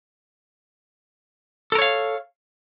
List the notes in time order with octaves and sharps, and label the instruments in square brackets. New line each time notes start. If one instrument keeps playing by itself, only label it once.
[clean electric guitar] A4
A#4
C#5
F5